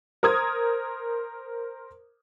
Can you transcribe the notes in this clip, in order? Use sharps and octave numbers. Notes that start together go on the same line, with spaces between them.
A#4 C5 D#6 G#6